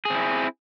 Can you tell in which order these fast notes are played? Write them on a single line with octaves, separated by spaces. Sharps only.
G#4 C4 E4